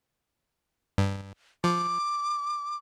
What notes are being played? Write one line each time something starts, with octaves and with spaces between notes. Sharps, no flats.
G2
F3 D6